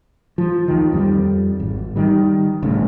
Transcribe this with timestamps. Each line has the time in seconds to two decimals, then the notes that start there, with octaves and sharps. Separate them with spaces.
0.38 F3
0.68 D#2 D#3
0.93 F2 G3
1.60 G#1
1.96 D#3 G3
2.62 E1 A1 G2 C#3